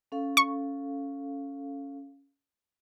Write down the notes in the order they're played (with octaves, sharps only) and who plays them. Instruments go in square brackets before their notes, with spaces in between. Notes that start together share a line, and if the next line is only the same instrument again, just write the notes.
[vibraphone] C#4 A4 F5
[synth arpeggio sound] C#6